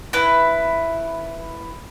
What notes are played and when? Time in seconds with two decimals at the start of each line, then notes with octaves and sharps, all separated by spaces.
0.13 E4 B4